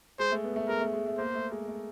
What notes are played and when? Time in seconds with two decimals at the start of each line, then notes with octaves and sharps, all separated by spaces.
0.19 G#3 C5
0.32 A3
0.44 B3
0.56 A3
0.68 G#3 A#4
0.81 A3
0.93 G#3
1.06 A3
1.18 A#3 C5
1.35 A3
1.51 G#3
1.68 A3